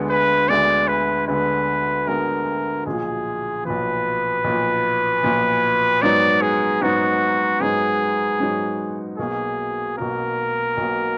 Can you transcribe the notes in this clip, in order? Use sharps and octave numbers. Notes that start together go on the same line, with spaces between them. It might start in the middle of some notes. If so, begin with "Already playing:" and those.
Already playing: D2 D3 G#3 B3
B4
D2 D3 G#3 B3 D5
B4
D2 D3 G#3 B3 B4
D2 D3 G#3 B3 A#4
B1 A#2 F3 G#4
B1 A#2 F3 B4
B1 A#2 F3
B1 A#2 F3
G#2 F#3 B3 D#4 D5
G#4
G#2 F#3 B3 D#4 F#4
G#2 F#3 B3 D#4 G#4
G#2 F#3 B3 D#4
B1 B2 A#3 G#4
B1 B2 A#3 A#4
B1 B2 A#3